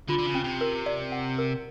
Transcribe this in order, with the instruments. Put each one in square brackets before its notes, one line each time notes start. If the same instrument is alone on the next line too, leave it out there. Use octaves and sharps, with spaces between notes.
[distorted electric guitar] D3 [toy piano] F4
[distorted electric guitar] D3
C#3
[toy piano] C#4
[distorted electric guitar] C3
[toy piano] A#4
D5
F#5
A#4